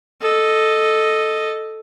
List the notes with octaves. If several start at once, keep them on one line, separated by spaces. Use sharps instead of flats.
A4 D#5